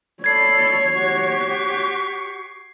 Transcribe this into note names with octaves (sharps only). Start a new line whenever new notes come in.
A4 C#5 D5 B5 G#6 C7
F#4 G4 C#6